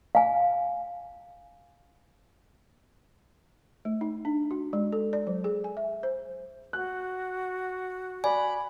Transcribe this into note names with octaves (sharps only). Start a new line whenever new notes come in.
F5 G#5
A3
D#4
D4
F#4
G#3
A4
D5
F#3
G#4
G#5
E5
C5
F#4 F#6
D5 G#5 B5